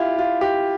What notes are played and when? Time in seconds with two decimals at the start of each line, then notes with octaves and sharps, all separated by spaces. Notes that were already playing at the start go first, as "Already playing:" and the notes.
Already playing: E4 F4 G4
0.19 F4
0.41 G4